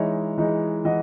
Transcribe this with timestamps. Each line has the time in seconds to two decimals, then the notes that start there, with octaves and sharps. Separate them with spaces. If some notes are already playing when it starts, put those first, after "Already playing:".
Already playing: E3 G#3 D#4 C#5 E5
0.38 E3 G#3 D#4
0.85 E3 D#5 F#5